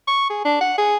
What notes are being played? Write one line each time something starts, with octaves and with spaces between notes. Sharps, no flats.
C#6
G#4
D4
F#5
G#4